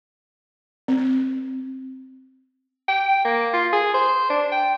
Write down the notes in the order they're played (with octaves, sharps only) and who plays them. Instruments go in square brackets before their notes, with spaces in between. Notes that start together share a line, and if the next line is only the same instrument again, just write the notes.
[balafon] C4
[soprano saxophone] G5
A#3
F4
G#4
C5
D4
G5